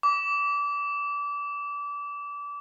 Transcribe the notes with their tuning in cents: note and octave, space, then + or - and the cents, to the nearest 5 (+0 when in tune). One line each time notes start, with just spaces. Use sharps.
D6 -25